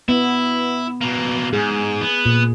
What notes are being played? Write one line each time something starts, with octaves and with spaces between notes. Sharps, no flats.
B3 E4
B2 A#3
G#2 G#4
B3
A#2